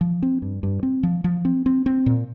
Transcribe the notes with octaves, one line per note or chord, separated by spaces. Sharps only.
F3
C4
G2
G2
C4
F3
F3
C4
C4
C4
A#2